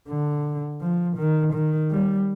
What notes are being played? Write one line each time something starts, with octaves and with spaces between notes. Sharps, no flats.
D3
F3
D#3
D#3
G3